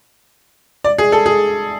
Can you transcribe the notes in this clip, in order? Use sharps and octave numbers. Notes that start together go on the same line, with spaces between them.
D5
G#4
A4
G#4